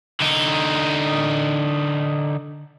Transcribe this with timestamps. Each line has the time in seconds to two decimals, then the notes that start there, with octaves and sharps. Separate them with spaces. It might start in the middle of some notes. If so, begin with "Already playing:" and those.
0.21 D3 D#4